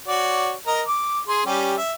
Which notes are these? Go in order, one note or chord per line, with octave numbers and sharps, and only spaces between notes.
F#4 C#5 D5
A#4 D#5 A#5
D6
G#4 C6
G3 C#4 G4
E5